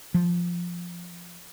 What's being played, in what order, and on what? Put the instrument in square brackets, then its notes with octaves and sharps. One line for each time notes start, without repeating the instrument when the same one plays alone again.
[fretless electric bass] F3